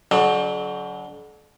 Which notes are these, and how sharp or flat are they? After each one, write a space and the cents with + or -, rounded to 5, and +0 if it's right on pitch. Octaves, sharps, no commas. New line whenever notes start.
D3 -45 F#3 +0 D5 +35